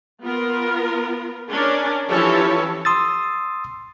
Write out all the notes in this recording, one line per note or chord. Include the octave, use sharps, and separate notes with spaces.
B3 F4 A#4
C#4 D4 A#4
E3 F3 C#4 G4 A4 C#5
C6 D#6 E6 A6